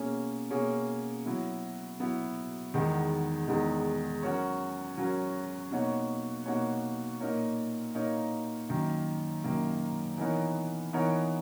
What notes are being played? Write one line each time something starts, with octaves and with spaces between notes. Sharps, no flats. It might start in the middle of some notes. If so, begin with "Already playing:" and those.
Already playing: B2 A#3 C#4 G#4 C#5
B2 A#3 C#4 G#4 C#5
F#3 B3 E4
F#3 B3 E4
E2 D#3 G#3 B3 D#4
E2 D#3 G#3 B3 D#4
F#3 C#4 F#4 A#4 C#5
F#3 C#4 F#4 A#4 C#5
B2 A#3 D#4 F#4 C#5
B2 A#3 D#4 F#4 C#5
A#2 A#3 D#4 A#4 C#5
A#2 A#3 D#4 A#4 C#5
F#2 D#3 A#3
F#2 D#3 A#3
E3 B3 D#4 A#4 C#5
E3 B3 D#4 A#4 C#5